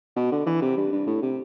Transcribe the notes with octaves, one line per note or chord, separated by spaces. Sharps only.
B2
D3
E3
C3
G2
G2
A2
C3